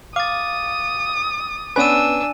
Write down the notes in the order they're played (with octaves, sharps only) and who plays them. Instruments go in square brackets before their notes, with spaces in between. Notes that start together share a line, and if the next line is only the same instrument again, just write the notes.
[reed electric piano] F5 [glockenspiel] D6 A6 [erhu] D#6
[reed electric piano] B3 C#4 B4 [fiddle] D4 E6 [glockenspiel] G#5 D#7